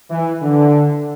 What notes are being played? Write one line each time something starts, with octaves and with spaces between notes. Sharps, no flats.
E3
D3